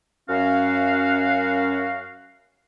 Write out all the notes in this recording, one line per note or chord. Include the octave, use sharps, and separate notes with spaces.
F#2 C#4 F#4 F5